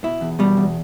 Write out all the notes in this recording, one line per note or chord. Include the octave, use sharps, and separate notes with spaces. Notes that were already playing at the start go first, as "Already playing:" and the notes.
B2 E4
E2
B2 G3
E2